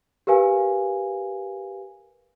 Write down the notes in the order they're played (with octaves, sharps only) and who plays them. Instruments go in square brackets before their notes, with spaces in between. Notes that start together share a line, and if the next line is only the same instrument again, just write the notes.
[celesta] G4 A#4 B4 F5 G#5